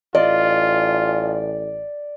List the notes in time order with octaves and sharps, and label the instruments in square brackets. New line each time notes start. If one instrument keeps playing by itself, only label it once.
[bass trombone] A1 [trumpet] F4 [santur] D5 [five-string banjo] D#5